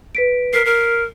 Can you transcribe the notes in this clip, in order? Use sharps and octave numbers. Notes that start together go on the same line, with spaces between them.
B4 B6 D7
A#4 F6 B6 C7
A#4